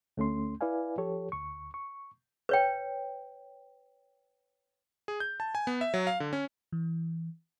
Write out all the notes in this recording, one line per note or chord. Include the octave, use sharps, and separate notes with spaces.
D2 A3 C#4 C6
E4 B4 D5 F5 G#5
F3 G4 A4 C#5
D2 C#6
C#6
B4 C#5 G5
G#4
G6
A5
G#5
B3
E5
F#3
F5
D3
C#4
E3